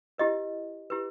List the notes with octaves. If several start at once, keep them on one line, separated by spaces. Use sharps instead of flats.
E4 G4 B4 D#5
E4 G4 B4